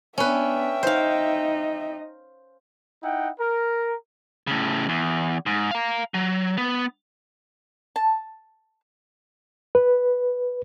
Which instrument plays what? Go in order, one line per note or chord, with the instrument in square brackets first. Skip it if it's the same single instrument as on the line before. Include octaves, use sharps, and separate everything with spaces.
[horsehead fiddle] B3 D4 [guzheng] C#4 B4 [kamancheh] E5 G5
[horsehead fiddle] D#4 D#5 [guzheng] C5 F5
[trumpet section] D#4 E4 F#5 G5
A#4
[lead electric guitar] A2 C#3
E2
G#2
F5 A#5
F#3
B3
[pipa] A5
[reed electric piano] B4